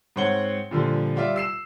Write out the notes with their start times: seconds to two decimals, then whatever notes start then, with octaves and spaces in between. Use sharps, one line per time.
0.16 G#2 C4 C#5 F#5 G7
0.71 A#2 D3 F3 G3
1.16 G3 F4 D5 E5
1.36 E6 C7 E7